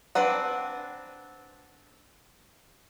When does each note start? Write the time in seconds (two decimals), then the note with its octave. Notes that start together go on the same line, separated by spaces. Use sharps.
0.15 C4 D4 B4 F#5